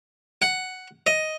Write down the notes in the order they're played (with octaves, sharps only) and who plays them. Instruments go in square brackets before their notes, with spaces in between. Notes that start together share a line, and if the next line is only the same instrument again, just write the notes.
[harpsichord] F#5
D#5